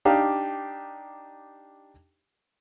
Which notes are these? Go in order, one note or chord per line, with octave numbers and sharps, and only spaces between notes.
D4 D#4 G4 F5